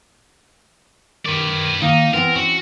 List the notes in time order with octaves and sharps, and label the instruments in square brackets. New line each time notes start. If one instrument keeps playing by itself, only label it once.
[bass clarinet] D#3 [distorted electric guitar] B4 D5
[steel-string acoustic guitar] D#3 [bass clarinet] A#3 [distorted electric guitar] D#4
[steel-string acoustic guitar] E3 B3 [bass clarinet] C4 [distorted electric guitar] A#4
[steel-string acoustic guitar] C#4 [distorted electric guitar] F#4